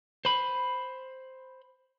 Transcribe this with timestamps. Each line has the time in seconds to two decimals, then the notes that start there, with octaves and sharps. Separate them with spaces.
0.25 C5 B5